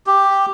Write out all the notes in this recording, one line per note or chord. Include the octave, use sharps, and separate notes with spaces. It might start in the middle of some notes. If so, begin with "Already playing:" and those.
G4